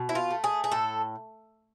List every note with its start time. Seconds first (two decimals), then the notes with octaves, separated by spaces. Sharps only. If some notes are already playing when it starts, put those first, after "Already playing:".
Already playing: B2
0.09 E4
0.15 F4
0.31 A3
0.44 G#4
0.64 G#4
0.71 A2 A4